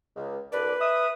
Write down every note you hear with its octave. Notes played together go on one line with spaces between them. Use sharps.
C#2
C2 D3 B4 D5
E5 D#6